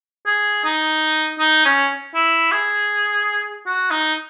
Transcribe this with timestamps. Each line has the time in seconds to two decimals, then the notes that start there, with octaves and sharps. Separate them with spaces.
0.26 G#4
0.64 D#4
1.39 D#4
1.65 C#4
2.15 E4
2.52 G#4
3.66 F#4
3.91 D#4